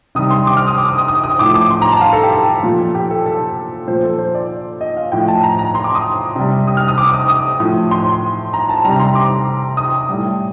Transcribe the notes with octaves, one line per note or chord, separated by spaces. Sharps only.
C3 D#3 G3 D#6
C6
D6
F6
D#6
D6
D#6
D#6
D#6
D#6
A2 F3 D6
D6
C6
A#5
A5
F5
A4
G4
A4
A#2 F3
G4
A4
A4
A#2 F3 C5
A4
C5
D5
D#5
F5
A2 F3 G5
A5
A#5
A#5
C6
D6
D#6
C3 G3
D#6
F6
D#6
D6
D#6
D#6
A2 F3
C6
A#5
A5
C3 G3 A#5
C6
D6
D#6
A2 G3